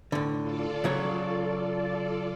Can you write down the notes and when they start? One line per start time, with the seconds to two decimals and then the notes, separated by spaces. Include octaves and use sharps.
0.12 A2 D3
0.41 F4 A4 D5
0.84 C#3 F#3 C#5